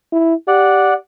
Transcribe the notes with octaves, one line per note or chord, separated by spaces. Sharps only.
E4
G4 D5 F#5